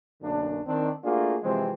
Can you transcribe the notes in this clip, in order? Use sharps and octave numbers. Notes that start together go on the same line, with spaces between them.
B1 F#2 D3 A#3 D4
D#3 C4 D4
A3 A#3 D4 F4 F#4 G#4
C3 E3 F3 G#3 C4